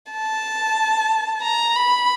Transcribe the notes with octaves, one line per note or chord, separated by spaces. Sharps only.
A5
A#5
B5